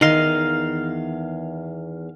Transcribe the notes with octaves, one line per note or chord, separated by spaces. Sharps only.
E2 D#3 D#5 F5 C6